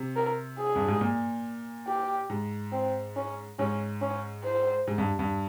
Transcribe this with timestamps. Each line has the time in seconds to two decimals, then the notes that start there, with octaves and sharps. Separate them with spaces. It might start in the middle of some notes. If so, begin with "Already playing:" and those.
Already playing: C3
0.16 A#4
0.59 G#4
0.75 G2
0.88 G#2
1.01 A#2
1.87 G4
2.30 G#2
2.72 C4
3.16 C#4
3.59 G#2 C#4
4.01 C#4
4.45 C5
4.87 G#2
4.98 G2
5.19 G2